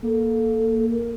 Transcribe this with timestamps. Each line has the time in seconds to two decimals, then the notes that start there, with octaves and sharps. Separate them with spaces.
0.03 A#3 A4
0.91 A#4